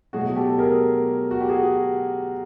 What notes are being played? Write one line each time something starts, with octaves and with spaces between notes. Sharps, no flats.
B2 F#3 A3 F#4 G#4
G4 A4
G#4 A#4
F#4
G4
F#4 G#4